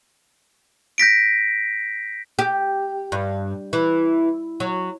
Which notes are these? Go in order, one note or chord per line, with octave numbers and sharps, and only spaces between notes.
G6 A#6 B6 D7
G4
G2
E3
F#3